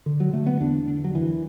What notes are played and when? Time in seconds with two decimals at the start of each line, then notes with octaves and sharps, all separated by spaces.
0.06 D3
0.20 F#3
0.33 D3 A3
0.47 B3
0.60 E2 D4
0.87 D3
1.04 F#3
1.15 F#2 E3